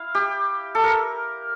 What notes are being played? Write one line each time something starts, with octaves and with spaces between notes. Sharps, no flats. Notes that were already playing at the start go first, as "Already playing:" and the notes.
Already playing: E4 F5
G4
A4
A#4